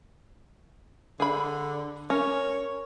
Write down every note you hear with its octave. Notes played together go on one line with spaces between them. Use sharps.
D3 G#4 B5
C#4 A#4 C#5